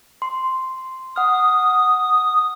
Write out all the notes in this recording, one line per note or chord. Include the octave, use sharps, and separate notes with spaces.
C6
F#5 D#6 F6